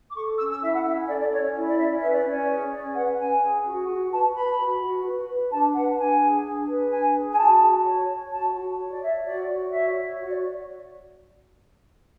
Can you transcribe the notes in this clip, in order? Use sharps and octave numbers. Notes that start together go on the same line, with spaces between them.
D6
A4 C#6
C#4 E6
E6
E4 E5
F#5
C#4 E5
A4 D5
D5
C#4 C#5
E4
D5
C#4 E5
B4 E5
D5
C#4
G#4
C#4 D5
B4 F#5
C#4 G#5
G#4
F#4
F#4
B4 A5
B4 B5
F#4
F#4
B4
B4
D4 A5
B4 F#5
D4 G#5
G#4
D4
B4
D4 G#5
G#4
G#5
F#4 A5
F#4
C#5
C#5
F#4 A5
F#4
C#5
D5
C#5 E5
F#4 D5
F#4
C#5 E5
C#5
F#4
D5